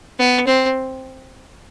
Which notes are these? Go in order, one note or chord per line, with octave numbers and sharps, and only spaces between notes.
B3
C4